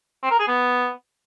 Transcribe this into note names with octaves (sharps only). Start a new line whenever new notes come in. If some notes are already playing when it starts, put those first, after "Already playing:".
C4
A#4
G#4
B3